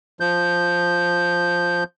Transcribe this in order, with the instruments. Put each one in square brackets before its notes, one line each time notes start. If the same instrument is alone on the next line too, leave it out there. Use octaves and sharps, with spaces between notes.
[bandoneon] F3 G6